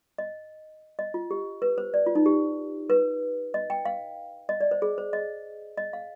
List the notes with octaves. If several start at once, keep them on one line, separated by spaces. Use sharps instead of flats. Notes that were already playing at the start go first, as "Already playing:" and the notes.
D#5
D#5
F4
G4
B4
C5
D5
F4
D#4
G4
B4
D#5
G5
F5
D#5
D5
C5
G#4
C5
D#5
D#5
F5